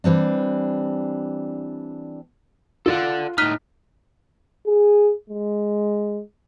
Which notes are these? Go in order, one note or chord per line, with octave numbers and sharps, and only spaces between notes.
E3 G3 C4 D4
F4 A4 D5 F#5
A2 D#4 F6 F#6 B6
G#4
G#3